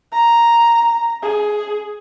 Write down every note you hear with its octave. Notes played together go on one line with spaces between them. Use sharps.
A#5
G#4